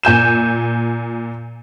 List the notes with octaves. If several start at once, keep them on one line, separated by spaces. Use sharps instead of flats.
A#2 G#5 G6 E7